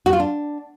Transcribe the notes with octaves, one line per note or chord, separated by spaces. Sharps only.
F#4
F4
D4